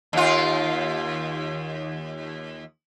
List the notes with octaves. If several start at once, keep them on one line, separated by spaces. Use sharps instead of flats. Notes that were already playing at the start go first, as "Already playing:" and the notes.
D#2 F4